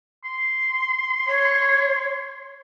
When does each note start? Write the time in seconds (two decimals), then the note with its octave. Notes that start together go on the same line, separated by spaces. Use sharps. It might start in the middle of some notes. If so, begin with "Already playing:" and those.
0.24 C6
1.27 C#5